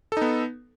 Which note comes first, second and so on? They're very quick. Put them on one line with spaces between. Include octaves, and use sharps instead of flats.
A4 D#4 B3